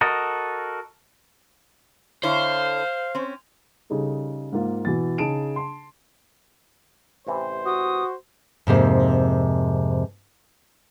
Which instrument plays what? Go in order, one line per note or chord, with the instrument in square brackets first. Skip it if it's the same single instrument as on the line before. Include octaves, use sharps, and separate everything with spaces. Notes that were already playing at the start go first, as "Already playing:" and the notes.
[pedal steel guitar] F#4 A4 A#4 D#5
[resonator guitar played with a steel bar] D3 E4 C#5 [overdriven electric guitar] C5 [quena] F5
[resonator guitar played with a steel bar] C4 C#4
[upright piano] C#3 G3 D#4 G#4 A4
G#2 A#3 F4
B2 E3 A6
C#3 D#4 G#4 A5 D7 E7
A5 C6
[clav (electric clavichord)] A1 C3 E3 [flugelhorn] C5
[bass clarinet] F#4 [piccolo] D#6
[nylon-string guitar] F2 G#2 C3 A#3